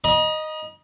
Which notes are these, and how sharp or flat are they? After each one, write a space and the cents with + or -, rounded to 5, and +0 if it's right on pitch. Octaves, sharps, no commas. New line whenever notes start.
D#5 -5 A#5 +45